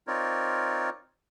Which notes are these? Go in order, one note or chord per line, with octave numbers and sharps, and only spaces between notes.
C4 D#4 F4 A#4 C#5 D5